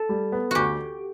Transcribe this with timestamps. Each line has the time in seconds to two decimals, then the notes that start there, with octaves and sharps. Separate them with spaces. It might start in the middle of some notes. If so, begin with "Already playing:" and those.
Already playing: A4
0.09 G3
0.32 B3
0.51 D2 F#4 G4